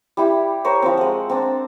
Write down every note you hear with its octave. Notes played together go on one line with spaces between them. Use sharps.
G3 E4 G4
A#4 C5 C#5 G5
F3 C4
G#3 F#5
C4 D4